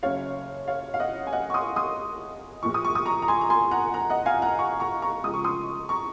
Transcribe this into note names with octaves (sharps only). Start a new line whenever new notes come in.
F#1 F#2 C#3 C#5 F5
C#5 F5
F5
D#5 F#5
G#5
D#5 F#5
C#6
C6 D#6
C6 D#6
A#1 A#2 F3 C#6
D#6
C#6
D#6
A#5 C#6
A#5
G#5 C6
A#5
G#5 C6
F#5 A#5
F#5 A#5
D#5 F#5
F5 G#5
F#5 A#5
A#5 C#6
A#5 C#6
A#5 C#6
C#2 C#3 F3 D#6
C#6
C6 D#6
A#5 C#6